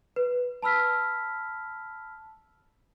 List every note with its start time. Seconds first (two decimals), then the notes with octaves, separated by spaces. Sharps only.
0.16 B4
0.63 A5 B5 E6 F6 B6